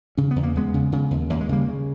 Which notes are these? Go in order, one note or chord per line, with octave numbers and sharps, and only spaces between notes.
C#3 C#4
B3
E2
A#3
E2 G#3 B3
C#3
C#3
D#2
D#2 A#3
G#3
C#3 G3 A#3
C#3